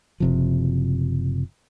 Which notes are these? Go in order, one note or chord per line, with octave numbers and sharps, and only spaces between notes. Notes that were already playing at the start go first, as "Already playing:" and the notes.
F#1 C3 F3